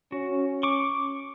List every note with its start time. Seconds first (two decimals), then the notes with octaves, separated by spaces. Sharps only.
0.12 C#4 F#4
0.63 C#6 D6